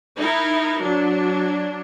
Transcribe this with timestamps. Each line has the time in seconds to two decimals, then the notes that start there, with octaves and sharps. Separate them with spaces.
0.16 D#4 E4 A#4
0.79 F#3 D4